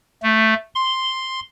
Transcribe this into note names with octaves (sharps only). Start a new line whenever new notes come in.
A3
C6